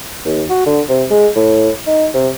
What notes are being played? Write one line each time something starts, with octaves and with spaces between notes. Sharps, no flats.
D#2
F#4
D3
C3
G#3
A2
D#4
C3